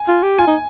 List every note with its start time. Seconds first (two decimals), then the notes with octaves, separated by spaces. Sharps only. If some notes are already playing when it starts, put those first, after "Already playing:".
Already playing: G#5
0.08 F4
0.23 G4
0.38 F4 G#5
0.47 D#4